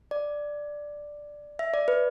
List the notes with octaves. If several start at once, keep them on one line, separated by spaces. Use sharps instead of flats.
D5
E5
D5
B4